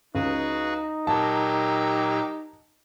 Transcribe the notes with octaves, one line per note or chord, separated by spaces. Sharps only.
C#2 D#4 F#4 G#4 B4
A#2 F#3 G4 A#4 A5 E6